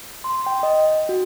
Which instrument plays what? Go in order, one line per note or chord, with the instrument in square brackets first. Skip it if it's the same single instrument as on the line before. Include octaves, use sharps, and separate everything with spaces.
[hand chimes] C6
G5
D#5
F#4